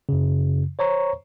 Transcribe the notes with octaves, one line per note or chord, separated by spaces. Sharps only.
F#2 C#3
C5 C#5 A#5 C#6